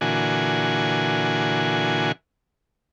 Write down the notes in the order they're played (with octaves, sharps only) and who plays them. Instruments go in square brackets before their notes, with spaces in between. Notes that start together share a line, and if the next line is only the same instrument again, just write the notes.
[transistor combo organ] A#2 D3 E3 F#4 G#5